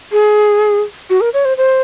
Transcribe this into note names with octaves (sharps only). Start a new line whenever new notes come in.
G#4
F#4
A#4
C#5
C5
C5